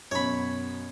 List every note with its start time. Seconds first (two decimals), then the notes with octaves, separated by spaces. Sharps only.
0.11 F#2 B2 C#5 B5